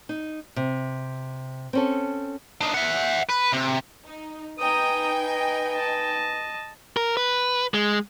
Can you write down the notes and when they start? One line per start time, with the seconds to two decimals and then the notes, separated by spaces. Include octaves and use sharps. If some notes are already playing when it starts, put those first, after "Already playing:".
0.09 D#4
0.56 C3
1.73 C4 C#4 A4
2.61 D4 D#4
2.74 E5 F#5
3.29 B4
3.53 C3
4.07 D#4
4.59 D#4 B4 G5 G#5 A#5 D#6
5.25 D#5
5.72 D#5 A5
6.97 A#4
7.17 B4
7.74 G#3